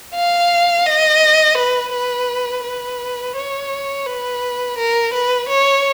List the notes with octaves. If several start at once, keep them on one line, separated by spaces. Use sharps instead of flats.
F5
D#5
B4
B4
B4
C#5
B4
A#4
B4
C#5